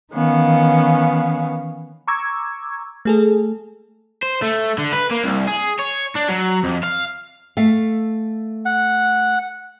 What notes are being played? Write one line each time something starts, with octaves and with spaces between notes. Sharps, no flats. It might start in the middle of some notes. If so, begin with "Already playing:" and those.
D#3 E3 B3 C#4 F5
A#5 C#6 D6 E6 G#6
A3 G#4 A4
C5
A3
D3
B4
A#3
C2
G#4
C#5
D4
F#3
F2
F5
A3 E5 F5
F#5